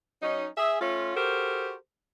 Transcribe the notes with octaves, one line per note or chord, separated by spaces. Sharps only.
F#3 C#4 D#4
G#4 E5
A3 C#4 F4
F#4 G4 A4 A#4 C5